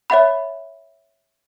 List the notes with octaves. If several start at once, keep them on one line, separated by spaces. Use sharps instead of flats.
C#5 E5 F#5 B5